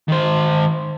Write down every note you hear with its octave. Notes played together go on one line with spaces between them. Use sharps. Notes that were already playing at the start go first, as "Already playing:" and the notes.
D#3 C5